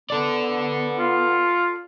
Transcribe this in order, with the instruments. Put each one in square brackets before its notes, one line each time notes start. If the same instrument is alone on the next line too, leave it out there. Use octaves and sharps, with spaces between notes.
[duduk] B3 [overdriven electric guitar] A4 D5
[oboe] F4